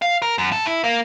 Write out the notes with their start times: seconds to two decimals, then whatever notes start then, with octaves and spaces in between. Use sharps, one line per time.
0.02 F5
0.22 A#4
0.38 F#2
0.52 A4
0.66 E4
0.84 A#3